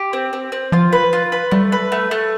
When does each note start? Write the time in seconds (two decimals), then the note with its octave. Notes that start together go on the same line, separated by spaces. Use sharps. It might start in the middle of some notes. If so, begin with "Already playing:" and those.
Already playing: G4
0.13 C4
0.33 C4
0.52 C4
0.72 F3 F4
0.93 B4
1.13 F4
1.32 B4
1.51 G3 A3
1.72 B4
1.92 A3
2.11 A3